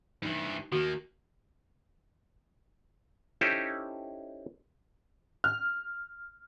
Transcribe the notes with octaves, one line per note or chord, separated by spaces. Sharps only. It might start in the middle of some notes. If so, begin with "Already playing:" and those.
G2 E3 D#4
D#3 A#3 F#4
C#4 D#4 E4 G4 A4 C5
F6